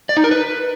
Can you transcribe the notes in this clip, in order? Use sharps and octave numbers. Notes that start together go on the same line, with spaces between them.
D5
D#4
A#4
B4